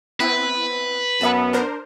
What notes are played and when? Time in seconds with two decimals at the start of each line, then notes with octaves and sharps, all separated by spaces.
0.20 B3 C4 E4 B4
1.21 F#2 B3 E5 A5
1.53 D4 A#4 C5